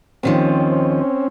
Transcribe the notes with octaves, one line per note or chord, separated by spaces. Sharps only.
D#2 D#3 F3 C4 C#4